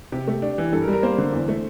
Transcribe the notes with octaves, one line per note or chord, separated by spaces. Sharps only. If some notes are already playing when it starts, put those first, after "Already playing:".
C3 G4
A3
D4
E3
G2 A4
A#4
G3
A#4
A#3 C5
D3
E2
A3